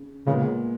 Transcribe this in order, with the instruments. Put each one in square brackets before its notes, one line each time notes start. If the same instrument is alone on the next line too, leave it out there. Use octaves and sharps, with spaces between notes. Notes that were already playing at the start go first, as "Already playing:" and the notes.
Already playing: [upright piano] C#3
[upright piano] A#2 G#3 B3 [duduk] C#3